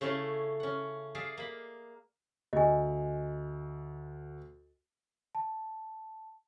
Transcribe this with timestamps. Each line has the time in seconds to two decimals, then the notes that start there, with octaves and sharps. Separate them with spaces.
0.01 C#3 A3 C#4 E4 C#5
0.60 C#4 F#5
1.15 G#4 D5 E5 F5
1.37 A#3 B5
2.53 D2 D#5 G#5
5.35 A5